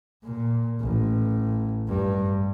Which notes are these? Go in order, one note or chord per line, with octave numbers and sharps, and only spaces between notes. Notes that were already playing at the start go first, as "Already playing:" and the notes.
A#2
A1
G2